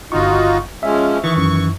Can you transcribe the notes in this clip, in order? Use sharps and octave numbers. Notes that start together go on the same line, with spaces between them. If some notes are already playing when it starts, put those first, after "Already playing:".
G1 D#4 F4 F#4 C#6
F3 G#3 C#4 E5
D#3 E3 C#6
F#2 C#6